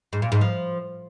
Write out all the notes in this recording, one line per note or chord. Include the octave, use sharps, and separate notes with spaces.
G#2
A#2
G#2
F3